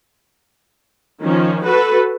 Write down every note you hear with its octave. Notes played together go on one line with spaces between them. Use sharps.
D#3 F3 C#4
F#4 A4 B4